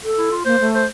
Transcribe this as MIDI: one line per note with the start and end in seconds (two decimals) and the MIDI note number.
0.04 0.32 69
0.18 0.30 64
0.31 0.41 65
0.45 0.59 58
0.45 0.67 72
0.60 0.81 57
0.75 0.86 72